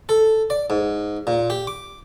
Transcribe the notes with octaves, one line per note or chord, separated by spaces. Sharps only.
A4
D5
G#2
A#2
G4
D6